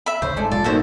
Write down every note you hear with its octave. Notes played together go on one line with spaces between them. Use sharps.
E5 B5
D2 C#3 C5
G#1 G#2 G#3 A4 D5
G#1 A#2 G3 F4 D5
D#3 A#3 E4 F#4 A4 C5